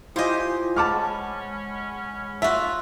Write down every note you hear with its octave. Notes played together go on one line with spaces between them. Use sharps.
E4 F4 G4 C5 D#5 G#5
G#3 C#4 F#5 A5 B5 D6 F6
F4 F#4 E5